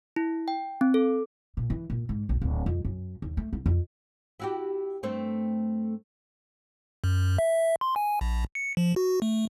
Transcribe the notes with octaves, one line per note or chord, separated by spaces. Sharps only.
E4
G5
C4
A4
A#2
E3
A#2
G#2
A#1
D1
F2
F#2
D#2
A3
C2
F2
E4 F#4 G4
G2 A3 C4
F#2
E5
C6
G#5
A#1
C#7
F3
F#4
A3